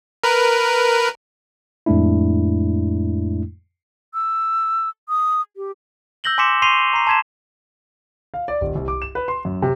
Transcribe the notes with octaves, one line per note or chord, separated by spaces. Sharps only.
A#4 B4
F2 A2 G#3 A3 D4 E4
E6
D#6
G4
E6 G6 A#6 F#7 G7
G#5 C6 D6 B6 C#7 E7
C6 C#6 C7 D#7 F7 G7
A#5 C#6 C7
A5 C6 G#6 B6 E7
F5
D5
D#1
C2
D6
E7
B4
C6
F#2
C3